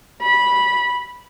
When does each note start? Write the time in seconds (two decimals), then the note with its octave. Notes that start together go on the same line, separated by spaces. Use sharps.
0.22 B5